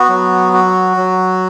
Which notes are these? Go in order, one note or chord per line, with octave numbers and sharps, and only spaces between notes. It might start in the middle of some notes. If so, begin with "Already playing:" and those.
Already playing: B3 F#4
F#3
F#4
F#3